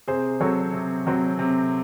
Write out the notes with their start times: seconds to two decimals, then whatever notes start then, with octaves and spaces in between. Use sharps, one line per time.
0.08 C3 G#4 C5
0.40 F#3 C4 A4 C#5
0.73 C3
1.07 F#3 C4
1.39 C3